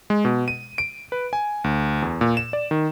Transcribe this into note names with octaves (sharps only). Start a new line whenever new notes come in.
G#3
B2
D#7
D7
B4
G#5
D2
E2
A#2
E7
D5
D#3